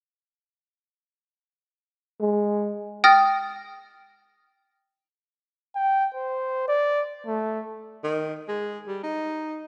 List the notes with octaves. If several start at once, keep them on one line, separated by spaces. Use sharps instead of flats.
G#3
G5 D#6 F6 A6 A#6
G5
C5
D5
A3
D#3
G#3
G3
D#4